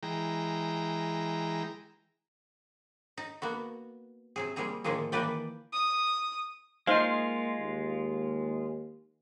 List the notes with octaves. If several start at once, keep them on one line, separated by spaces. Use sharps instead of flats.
E3 G#3 G5 A#5
D#4
A#3 B3 F#4
C3 F#3 G#4
F3 G3 A#3 G#4 A#5
A2 D3 D#3 F3 A#3 G#4
D#3 E3 A#3 B4 D5 G5
D#6
G#3 A#3 D#4 F4 C5 F5
D#2